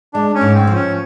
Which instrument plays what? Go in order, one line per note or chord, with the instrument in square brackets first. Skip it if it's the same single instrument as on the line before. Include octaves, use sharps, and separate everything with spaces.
[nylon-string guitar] G#3 [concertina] D4
[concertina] C#4
[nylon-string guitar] G#2
[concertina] C4
[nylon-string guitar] F3
[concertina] C#4